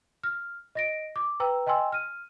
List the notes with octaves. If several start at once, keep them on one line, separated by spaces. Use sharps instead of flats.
F6
D#5 A#6 D7
D6
B4 G5 A#5 E6
D#5 G5 G#5 C6 E6
F6 D#7